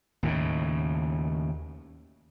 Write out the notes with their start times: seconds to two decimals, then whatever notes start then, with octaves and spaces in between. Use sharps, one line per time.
0.23 D#2 A2 C#3